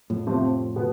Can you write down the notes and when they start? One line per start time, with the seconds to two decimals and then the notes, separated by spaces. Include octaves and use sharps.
0.10 F2 A2
0.27 C3 F3 A3 C4
0.76 B2 B3